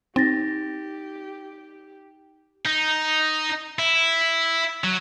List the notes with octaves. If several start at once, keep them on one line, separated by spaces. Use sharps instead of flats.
C4 D#4 G4 A6 A#6
D#4
E4
F#3